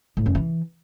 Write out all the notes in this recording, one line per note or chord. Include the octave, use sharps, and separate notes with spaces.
A2
F#2
E3